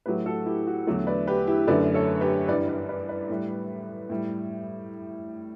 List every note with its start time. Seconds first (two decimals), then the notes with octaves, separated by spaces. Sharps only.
0.06 A2 F#3 A3 G4 B4
0.26 F#4 A4
0.46 E4 G4
0.67 F#4
0.87 E2 D3 F#3 A3
1.07 B4 D5
1.27 G4 B4
1.47 E4 G4
1.68 F#2 D3 A3 B4 D5
1.94 A4 C#5
2.21 G4 B4
2.48 G2 E3 G3 B4 D5
2.68 B4 D5
2.89 B4 D5
3.09 B4 D5
3.29 A2 G3
4.10 A2 G3